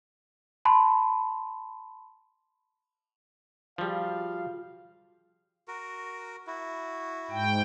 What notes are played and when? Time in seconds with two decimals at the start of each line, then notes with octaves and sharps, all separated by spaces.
0.65 A5 B5 C6
3.78 F3 G3 F4 F#4 G#4 F5
5.68 F#4 A#4
6.47 E4 F#4
7.31 G#2 G5